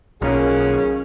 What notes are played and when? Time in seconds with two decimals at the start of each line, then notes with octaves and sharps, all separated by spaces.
0.22 B1 B2 D#3 A#3 C#4 F4 G#4